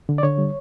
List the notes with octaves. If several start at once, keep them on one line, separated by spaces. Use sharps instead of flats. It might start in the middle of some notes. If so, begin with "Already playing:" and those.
D3
D5
D3 C#5
G3